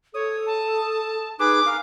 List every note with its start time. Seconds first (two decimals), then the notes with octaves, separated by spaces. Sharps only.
0.14 A4 C#5 D#6
0.46 A5
1.40 D#4 G#4 B4 D6
1.66 A#4 F5 G#5